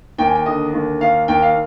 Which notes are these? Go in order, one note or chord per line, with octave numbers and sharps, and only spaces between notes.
D#2 G5
G#5
G5
D3 D#5
D#2
D#2 F5
D#2 G5
F5